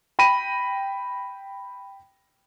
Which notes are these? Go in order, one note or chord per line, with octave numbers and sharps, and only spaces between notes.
G5 B5 A#6 D#7